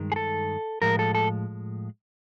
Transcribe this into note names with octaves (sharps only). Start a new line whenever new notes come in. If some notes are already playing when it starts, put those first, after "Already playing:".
Already playing: G2 D#3 G#3
G#4
A4
A2 F3 G#3 A#4
A4
A4